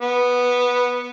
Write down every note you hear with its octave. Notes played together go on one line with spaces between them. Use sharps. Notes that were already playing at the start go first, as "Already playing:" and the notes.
B3